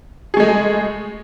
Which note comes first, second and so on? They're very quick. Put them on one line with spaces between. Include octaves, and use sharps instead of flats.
G#4 A3 G#3